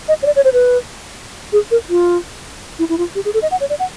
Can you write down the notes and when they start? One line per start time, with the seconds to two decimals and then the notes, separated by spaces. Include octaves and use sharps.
0.08 D#5
0.22 C#5
0.26 D5
0.36 C#5
0.45 C5
0.53 B4
1.52 G#4
1.71 A#4
1.90 F4
2.79 E4
2.89 E4
2.98 F4
3.15 G4
3.25 G#4
3.34 A4
3.42 D#5
3.51 F#5
3.60 C#5
3.70 D5
3.79 F#5